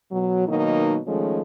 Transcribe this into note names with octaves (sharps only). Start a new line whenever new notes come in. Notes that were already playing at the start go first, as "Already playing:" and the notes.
B2 F#3
B2 D#3 F#3 A#3 D#4
D#3 F3 G#3 A3 C#4